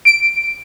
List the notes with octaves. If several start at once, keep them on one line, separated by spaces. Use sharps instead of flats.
D7